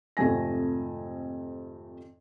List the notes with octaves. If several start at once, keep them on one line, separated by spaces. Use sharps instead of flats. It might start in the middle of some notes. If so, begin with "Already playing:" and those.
G#1 F2 C3 A3 G#5 A#6